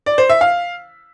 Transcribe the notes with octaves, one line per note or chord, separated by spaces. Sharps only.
D5
C5
E5
F5